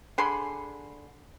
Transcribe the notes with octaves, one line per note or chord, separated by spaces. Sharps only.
D3 G#4 B5 C6